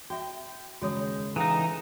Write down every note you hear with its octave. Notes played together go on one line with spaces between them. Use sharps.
F#4 E5 G5
D#2 C#3 G#3 F#4 C#5 D#6
E3 D#4 A4 F5 G5 A#5